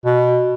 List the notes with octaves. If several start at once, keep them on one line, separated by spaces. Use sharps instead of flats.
B2